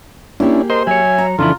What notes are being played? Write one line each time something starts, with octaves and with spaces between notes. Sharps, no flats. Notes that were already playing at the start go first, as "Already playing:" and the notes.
A#3 C#4 D4 E4 G4 G#4
A#4 C5 D#5 C6
F#3 C#5 E5 G#5
A#5
F2 C#3 E3 D4 E4 F4 A4